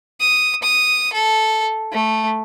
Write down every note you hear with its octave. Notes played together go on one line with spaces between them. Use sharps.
D#6
D#6
A4
A3